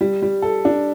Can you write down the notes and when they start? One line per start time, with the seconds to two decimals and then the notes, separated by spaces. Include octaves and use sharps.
0.01 G3
0.22 G3
0.42 A4
0.65 D4